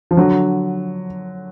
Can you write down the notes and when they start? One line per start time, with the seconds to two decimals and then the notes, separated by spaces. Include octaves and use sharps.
0.11 F3
0.17 D3 F#3